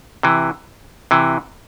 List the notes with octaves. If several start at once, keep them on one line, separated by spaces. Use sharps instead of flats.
C3 E3
C3 E3